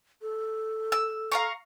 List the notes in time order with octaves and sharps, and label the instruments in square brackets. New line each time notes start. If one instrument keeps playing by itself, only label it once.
[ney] A4
[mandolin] E6
F5 A#5 C#6